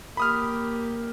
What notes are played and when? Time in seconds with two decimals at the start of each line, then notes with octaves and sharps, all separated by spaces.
0.17 A#3 G4 B5 D#6 F6